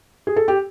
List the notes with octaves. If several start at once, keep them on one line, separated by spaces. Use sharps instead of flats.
G#4
A4
G4